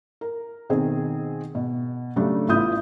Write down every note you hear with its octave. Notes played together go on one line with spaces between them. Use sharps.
A#4
B2 D#3 C4 G#4
B2
C#3 F#3 G3 A3 D4
A1 B3 E4 F4 D#6 G6